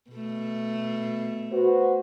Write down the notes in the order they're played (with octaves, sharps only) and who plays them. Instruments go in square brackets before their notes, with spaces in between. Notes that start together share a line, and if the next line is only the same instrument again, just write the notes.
[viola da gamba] B2 A3
[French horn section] F#4 B4 C5